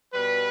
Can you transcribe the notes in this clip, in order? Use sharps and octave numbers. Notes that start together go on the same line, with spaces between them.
B2 G3 B4